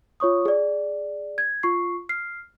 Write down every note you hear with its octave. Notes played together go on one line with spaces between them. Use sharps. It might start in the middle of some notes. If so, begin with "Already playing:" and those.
F4 C#5 C#6 D#6
G#4 D5
G#6
F4 C#6 C7
F6 C7